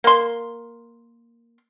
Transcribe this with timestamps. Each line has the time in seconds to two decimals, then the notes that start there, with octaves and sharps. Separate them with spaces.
0.04 A#3 C6